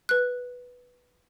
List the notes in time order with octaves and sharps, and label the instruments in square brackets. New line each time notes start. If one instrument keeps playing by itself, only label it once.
[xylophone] B4 F#6